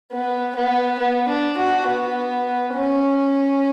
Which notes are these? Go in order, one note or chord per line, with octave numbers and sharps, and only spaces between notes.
B3
B3
B3
D4
F#4
B3
C#4